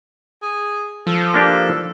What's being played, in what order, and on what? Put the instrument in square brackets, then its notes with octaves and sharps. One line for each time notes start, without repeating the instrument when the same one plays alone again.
[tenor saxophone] G#4
[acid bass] F3 [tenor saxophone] A4
[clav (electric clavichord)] A#3 D4 G4